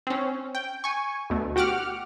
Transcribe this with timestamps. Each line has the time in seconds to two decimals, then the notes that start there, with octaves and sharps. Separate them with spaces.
0.07 C4 C#4
0.55 G5
0.84 G#5 C#6
1.30 D2 B2 A3
1.56 F#4 G4 F#5 D6 F6